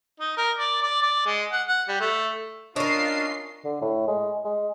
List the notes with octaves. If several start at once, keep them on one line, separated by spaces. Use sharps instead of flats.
D#4
A#4
D5
D5
D5
G#3
F#5
F#5
G3
A3
C#4 D4 F4 A#4 D#5 C7
D3
A2
G#3
G#3